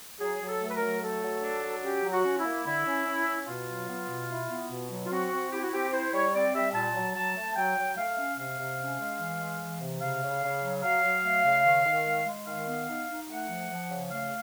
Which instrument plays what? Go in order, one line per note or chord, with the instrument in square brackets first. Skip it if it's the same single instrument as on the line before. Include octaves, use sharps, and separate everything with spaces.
[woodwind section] F#3 G#4
F#3
A4
A3
B4
A#4
F#3
A3 A4
F#3
D4
F#3
C#4 G4
F#3
F#4
C#4
E4
A#3
D3 E4
C#4
C#4
C#4
B2 F4
F#3
B3
B2
E4
B3
B2
F#3
F4
C4 F#4
C4
E4 G4
F#4
C4 G4
E4 C5
G3 C#5
C4 D5
G3 E5
A#2 A5
F#3
F#3 A5
A3
F#3 G5
F#3
A3 F5
C#4
C3 F5
C3
C#4
G#3
E3
G#3
E3
C3
C#3 F5
C#3
C#3
F#3
F#3 F5
F#3
A3
C#3
D#3
D#3
G#3
G#3
D#3 F5
B3
D#4
D#4
A3 F#5
F3
F3
C#3
A3 F5